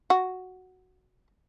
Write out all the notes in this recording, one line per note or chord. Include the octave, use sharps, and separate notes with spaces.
F#4